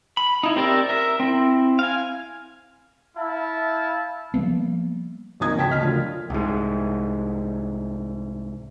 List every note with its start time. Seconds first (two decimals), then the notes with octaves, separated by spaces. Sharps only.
0.17 B5
0.43 D#4 E4
0.56 C4 G4 A#4 D5 E5
0.89 A#4 E5
1.20 C4 E4
1.79 F5 G#5
3.17 E4 E5 F5 A5
4.34 F3 G3 A#3 B3
5.40 G#1 D2 A#3 D#4 D#6 G#6
5.56 D2 C#3 F#4 G5 A5 B6
5.68 D2 C#3 D#5 F6 B6
5.81 F#2 D3 A3 F4
6.30 C2 G#2